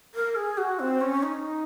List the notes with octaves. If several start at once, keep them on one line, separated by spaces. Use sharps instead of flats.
A#4
G#4
F#4
C4
C#4
D#4